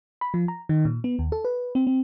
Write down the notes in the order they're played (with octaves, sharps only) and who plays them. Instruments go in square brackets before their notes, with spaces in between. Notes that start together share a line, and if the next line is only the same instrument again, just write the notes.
[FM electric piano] B5
F3
A#5
D#3
A#2
B3
D#2
A4
B4
C4
C4